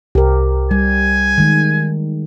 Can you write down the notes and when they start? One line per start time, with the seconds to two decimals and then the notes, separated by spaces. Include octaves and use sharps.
0.15 C2 G4 A#4
0.71 G3 G#5
1.38 D#3 G#3